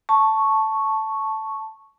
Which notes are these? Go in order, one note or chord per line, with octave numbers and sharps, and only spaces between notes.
A5 C#6